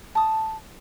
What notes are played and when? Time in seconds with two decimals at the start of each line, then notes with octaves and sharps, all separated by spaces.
0.15 A5 D#6